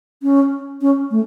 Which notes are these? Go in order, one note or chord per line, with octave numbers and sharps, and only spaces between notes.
C#4
C#4
A3